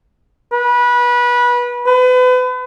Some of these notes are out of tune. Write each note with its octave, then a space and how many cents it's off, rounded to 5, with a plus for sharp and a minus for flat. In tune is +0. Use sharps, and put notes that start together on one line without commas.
B4 -25
B4 +35